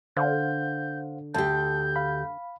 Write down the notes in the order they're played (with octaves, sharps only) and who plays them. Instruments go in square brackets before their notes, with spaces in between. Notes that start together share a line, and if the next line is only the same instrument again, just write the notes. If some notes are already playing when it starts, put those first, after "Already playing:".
[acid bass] D3 [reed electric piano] C5 F5 F#5 [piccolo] G6
[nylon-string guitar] D2 G4 [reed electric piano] A5 [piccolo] G6
[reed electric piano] F5 B5